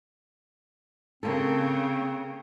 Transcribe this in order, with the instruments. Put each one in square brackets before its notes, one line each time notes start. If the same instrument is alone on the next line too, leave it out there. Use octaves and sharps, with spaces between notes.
[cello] C#3 [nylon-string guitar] A#3 A4 [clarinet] C4